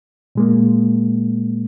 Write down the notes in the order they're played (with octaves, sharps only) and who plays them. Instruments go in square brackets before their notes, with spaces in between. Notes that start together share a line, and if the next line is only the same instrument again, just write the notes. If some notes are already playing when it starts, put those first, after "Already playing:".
[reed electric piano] A#2 G#3 A#3